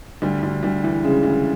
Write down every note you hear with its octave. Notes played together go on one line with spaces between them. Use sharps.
D2 G3
D2
D2 G3
E3
C#3 G#3
D2